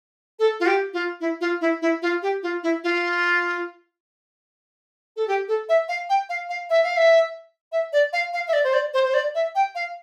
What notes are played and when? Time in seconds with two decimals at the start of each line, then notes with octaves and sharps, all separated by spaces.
0.39 A4
0.60 F4
0.66 G4
0.94 F4
1.21 E4
1.41 F4
1.61 E4
1.82 E4
2.02 F4
2.23 G4
2.43 F4
2.63 E4
2.84 F4
5.16 A4
5.28 G4
5.48 A4
5.69 E5
5.89 F5
6.09 G5
6.29 F5
6.49 F5
6.70 E5
6.84 F5
6.97 E5
7.72 E5
7.93 D5
8.13 F5
8.33 F5
8.48 E5
8.53 D5
8.64 C5
8.74 D5
8.94 C5
9.06 C5
9.14 D5
9.35 E5
9.55 G5
9.75 F5